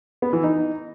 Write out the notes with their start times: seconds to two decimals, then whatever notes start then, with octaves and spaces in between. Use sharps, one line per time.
0.22 B3
0.33 E3
0.43 D#4